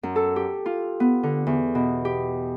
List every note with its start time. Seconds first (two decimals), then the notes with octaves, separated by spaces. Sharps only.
0.03 F#2
0.16 A4
0.36 G4
0.66 F4
1.00 B3
1.23 D3
1.47 E2
1.75 B2
2.05 G4